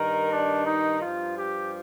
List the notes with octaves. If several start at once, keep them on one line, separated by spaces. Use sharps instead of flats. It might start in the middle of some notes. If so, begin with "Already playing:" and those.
Already playing: G2 D#3 A#4
D4
D#4
G2 F3 F4
G4